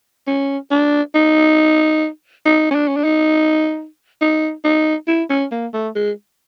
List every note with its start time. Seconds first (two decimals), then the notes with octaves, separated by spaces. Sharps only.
0.27 C#4
0.71 D4
1.15 D#4
2.46 D#4
2.71 C#4
2.75 D4
2.88 C#4
2.96 D4
3.04 D#4
4.21 D#4
4.64 D#4
5.08 E4
5.30 C#4
5.52 A#3
5.74 A3
5.96 G#3